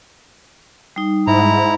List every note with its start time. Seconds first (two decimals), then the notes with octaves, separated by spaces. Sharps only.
0.96 G3 D#4
1.27 G#2 E4 A#5